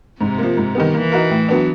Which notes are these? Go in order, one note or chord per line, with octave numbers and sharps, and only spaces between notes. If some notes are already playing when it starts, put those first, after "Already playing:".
G#2 C3
F3 A#3
G#2
D#3 G3 B3
E3 A#3
D#4 F#4 A#4
A2
F#3 B3 D4